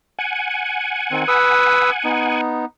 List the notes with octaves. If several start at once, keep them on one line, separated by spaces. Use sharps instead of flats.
F#5 G#5
D#3 C4
B4 D#6 E6
B3 D#4